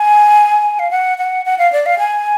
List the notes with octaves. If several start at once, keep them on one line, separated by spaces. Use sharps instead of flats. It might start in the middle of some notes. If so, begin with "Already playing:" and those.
Already playing: G#5
F5
F#5
F#5
F#5
F5
D5
F5
G#5